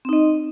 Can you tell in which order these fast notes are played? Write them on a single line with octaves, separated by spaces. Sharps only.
C4 D#4 D#5